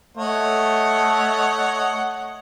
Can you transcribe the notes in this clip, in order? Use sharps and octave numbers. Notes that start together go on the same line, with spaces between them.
A3 C#5 D#5 F#5